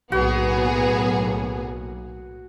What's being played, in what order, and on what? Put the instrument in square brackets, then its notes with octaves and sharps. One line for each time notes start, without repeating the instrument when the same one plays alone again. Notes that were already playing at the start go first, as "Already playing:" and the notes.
[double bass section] B1 A2 A#3 [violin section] B3 G#4 [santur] F#4